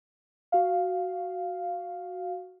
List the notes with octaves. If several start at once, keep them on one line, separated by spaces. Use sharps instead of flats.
F#4 F5